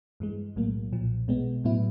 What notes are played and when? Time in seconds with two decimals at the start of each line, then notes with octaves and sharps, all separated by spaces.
0.20 G2 E3 G#3
0.56 B1 A2 F#3 A#3
0.93 B1 A#2 F3
1.28 B2 G#3 B3
1.64 A2 F#3 B3 E4